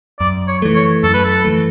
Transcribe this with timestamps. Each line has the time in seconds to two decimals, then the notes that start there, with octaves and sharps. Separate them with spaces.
0.20 F#2 D5
0.48 C#5
0.62 E3 A3
0.75 C#5
1.03 F#2 A4
1.13 B4
1.25 A4
1.44 E3 A3